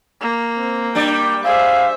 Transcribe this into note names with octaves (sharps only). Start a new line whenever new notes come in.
A#3
C4
G3 D4 D5 G5
G#4 C5 E5 F5